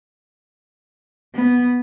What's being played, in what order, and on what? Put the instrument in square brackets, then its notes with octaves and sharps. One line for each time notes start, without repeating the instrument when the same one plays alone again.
[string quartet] B3